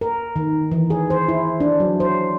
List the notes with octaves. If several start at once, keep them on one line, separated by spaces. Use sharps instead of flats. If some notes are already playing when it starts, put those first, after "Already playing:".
A#4
D#3
E3
G#4
C5
E4
D4
F#3
C5